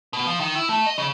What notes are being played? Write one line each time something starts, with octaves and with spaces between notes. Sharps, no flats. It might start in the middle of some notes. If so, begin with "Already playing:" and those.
B2
F3
D#3
E4
A3
D#5
C#3